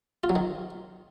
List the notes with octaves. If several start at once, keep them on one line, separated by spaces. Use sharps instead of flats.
F4
F#3
D#3